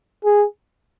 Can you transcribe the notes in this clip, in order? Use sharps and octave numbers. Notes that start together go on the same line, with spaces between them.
G#4